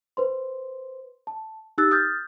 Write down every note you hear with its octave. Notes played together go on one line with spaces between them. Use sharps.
B4 C5 C6
A5
D#4 G4 E6 F#6 A6
D#6 F6 G6 A6